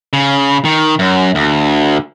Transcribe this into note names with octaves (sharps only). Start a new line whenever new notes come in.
C#3
D#3
F#2
D2